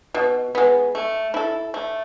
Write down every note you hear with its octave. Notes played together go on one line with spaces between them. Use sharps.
B2
G#3 B3
A3
E4 A4
A3